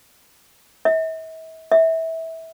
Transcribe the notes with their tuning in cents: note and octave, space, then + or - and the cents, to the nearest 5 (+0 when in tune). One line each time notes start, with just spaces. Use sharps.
E5 -40
E5 -20